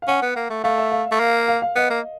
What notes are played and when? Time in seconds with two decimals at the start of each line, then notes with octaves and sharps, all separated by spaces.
0.02 F5
0.08 C#4 F#5
0.22 B3
0.36 A#3
0.50 A3
0.64 A3 F5
0.78 E5
0.92 F5
1.12 A3
1.20 A#3
1.48 F5
1.62 F5
1.76 B3 D#5
1.90 A#3